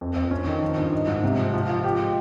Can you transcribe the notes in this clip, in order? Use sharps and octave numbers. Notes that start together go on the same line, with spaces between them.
F2
F2
C#4
D#3
F3
G2
D#4
G#2
C3
F3
F3
F4
G4
G#3